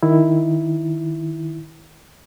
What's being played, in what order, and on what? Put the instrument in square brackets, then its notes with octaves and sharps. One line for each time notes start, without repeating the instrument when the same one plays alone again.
[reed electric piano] D#3 E4